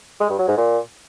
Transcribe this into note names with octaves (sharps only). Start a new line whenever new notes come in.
G#3
G2
F#3
G#2
A#2